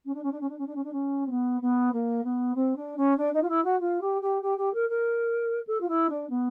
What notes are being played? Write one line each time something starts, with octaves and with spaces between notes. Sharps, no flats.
C#4
D4
C#4
D4
C#4
D4
C#4
D4
C#4
D4
C#4
C4
B3
B3
A#3
B3
C4
D4
C#4
D4
D#4
F4
E4
F#4
F4
G4
G4
G4
G4
A#4
A#4
A4
F4
E4
D4
B3